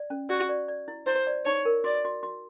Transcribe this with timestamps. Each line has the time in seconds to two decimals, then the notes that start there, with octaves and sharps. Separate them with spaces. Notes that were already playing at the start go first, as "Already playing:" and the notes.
Already playing: D5
0.10 C#4
0.29 F#4 D5
0.49 D5
0.68 D5
0.88 E4
1.06 E4 C5
1.27 D5
1.45 D#4 C#5
1.65 A#4
1.84 F#4 D5
2.05 F#4
2.23 F#4